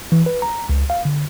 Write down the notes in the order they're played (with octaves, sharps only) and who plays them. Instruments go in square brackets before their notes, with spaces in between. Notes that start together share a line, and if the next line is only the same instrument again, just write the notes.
[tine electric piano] E3
B4
A#5
C#2
F5
D3